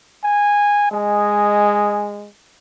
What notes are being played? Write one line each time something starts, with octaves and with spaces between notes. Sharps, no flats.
G#5
G#3 D#5 G#5